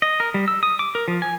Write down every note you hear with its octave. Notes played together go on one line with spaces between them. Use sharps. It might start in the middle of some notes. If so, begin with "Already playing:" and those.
D#5
A#4
G3
E6
D#6
D6
A#4
F3
G#5